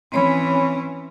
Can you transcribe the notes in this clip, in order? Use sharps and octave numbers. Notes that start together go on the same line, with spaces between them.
E3 C4 C#4 C#5 B5